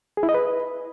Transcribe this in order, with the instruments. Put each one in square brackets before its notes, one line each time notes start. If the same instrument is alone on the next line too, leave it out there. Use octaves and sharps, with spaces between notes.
[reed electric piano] G#4
E4
D#5
B4